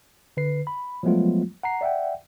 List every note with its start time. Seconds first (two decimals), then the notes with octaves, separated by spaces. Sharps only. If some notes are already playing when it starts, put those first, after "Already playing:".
0.37 D3 B4 C7
0.67 B5
1.03 F3 F#3 G#3 A3 B3 F4
1.63 F#5 A#5 C7
1.81 D5 E5 F#5 G5